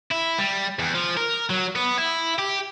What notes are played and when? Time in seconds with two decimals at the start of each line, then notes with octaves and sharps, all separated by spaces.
0.11 E4
0.38 G3
0.79 E2
0.95 F3
1.17 A#4
1.50 F#3
1.76 B3
1.98 E4
2.39 G4